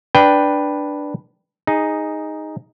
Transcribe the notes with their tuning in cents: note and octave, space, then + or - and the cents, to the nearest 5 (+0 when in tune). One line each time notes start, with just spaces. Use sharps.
D4 +0 B4 +0 G5 +0
D#4 +0 G#4 -10